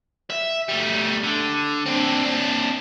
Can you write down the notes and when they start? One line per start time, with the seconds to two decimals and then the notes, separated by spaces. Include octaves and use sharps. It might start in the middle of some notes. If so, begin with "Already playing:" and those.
0.30 E5
0.69 G3 A3
1.24 D3
1.86 C4 D4
2.23 C4 D4